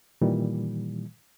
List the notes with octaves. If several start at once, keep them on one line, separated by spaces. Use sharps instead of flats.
A#2 D#3 E3 G3